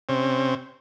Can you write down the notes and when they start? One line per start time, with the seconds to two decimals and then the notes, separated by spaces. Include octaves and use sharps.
0.09 C3 C4 C#4